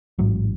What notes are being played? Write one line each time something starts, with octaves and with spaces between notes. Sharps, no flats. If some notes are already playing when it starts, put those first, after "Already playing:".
A1 G#2 F#3